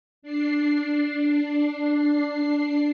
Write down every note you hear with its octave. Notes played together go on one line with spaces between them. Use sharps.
D4 C7